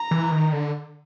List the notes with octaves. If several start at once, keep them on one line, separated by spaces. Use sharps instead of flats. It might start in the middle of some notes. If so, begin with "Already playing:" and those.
Already playing: A#5
E3
D#3
D3